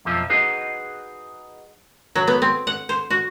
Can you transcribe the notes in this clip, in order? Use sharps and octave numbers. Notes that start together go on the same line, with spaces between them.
B1 F2 F3 E5
D#4 F#4 G#4 B4
F#3
B3
C4
F#5
C5
F#4